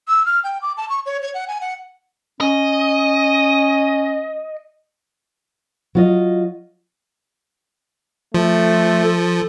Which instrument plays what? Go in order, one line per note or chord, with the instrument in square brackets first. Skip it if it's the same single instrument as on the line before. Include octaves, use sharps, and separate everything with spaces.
[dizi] E6
F6
G5
D6
A5
C#6
C#5
C#5
F#5
G#5
F#5
[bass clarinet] C#4 [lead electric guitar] D#5
[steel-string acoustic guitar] F#3 F4 D#5
[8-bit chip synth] F3 [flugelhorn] A3
[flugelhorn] A4